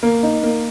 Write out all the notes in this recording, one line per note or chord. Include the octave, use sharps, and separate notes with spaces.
A#3
D#4
A#3